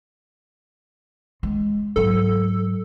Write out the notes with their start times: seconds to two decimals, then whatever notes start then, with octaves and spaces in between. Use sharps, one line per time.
1.43 G#3
1.96 G#2 F#3 A4